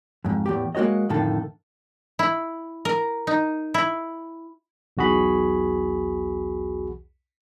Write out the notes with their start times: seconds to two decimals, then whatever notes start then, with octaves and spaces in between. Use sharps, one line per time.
0.25 F2 G#2
0.46 E2 A2 G4
0.75 G#3 A#3 F#4 C#5 D#5
1.09 F2 A2 D3 D#3 A4
2.19 E4
2.85 A#4
3.27 D#4
3.74 E4
4.97 B1 E2 F#4 G#4 B5